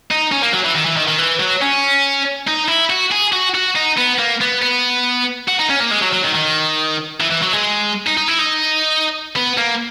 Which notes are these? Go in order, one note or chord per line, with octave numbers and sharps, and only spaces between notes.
D#4
C#4
A#3
F#3
E3
D#3
E3
D#3
D#3
E3
F#3
C#4
D#4
E4
F#4
G#4
F#4
F#4
D#4
B3
A#3
B3
B3
F#4
D#4
C#4
A#3
G#3
F#3
F#3
D#3
D#3
E3
E3
F#3
G#3
D#4
D#4
E4
D#4
B3
A#3